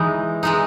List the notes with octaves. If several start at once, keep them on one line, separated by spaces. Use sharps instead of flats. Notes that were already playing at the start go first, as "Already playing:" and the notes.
Already playing: E3 G#3 D#4
E3 G#3 D#4